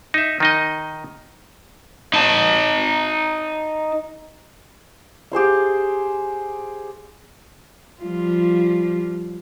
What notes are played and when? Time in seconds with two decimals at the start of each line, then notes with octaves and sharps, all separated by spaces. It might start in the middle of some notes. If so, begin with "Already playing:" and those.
0.14 D#4 E5
0.40 D#3 D#4 D#5
2.14 D#4 A5
5.32 G4 G#4 C5 F5
8.02 F3 G3 F4